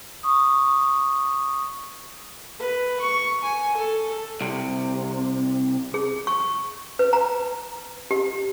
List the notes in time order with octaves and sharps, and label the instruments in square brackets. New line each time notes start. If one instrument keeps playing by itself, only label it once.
[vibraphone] C#6 D#6
[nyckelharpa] B4
C#6
G#5
A4
[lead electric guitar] C2 C3
[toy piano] G#4
C#6
B4
A#5
G4